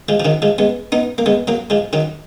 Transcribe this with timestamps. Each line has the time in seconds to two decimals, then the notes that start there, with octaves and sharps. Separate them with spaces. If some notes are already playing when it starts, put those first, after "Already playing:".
0.09 F3 G#3
0.20 F3
0.25 D#3 F#3
0.42 F3 G#3
0.58 G#3 B3
0.92 B3 D#4
1.18 A#3
1.26 G#3 B3
1.47 F#3 A#3
1.70 F3 G#3
1.93 D#3 F#3